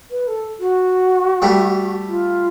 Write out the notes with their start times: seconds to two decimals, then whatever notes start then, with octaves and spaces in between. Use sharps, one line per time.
0.11 B4
0.28 A4
0.60 F#4
1.42 G3 A3
2.08 F4